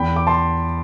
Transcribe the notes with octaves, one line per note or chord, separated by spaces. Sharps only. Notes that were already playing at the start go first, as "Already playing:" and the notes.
Already playing: E2 G5 B5
D6
A5 C6